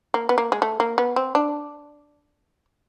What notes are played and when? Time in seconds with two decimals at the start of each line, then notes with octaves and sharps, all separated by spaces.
0.14 A#3
0.29 B3
0.38 A#3
0.52 G#3
0.62 A3
0.80 A#3
0.98 B3
1.16 C4
1.35 D4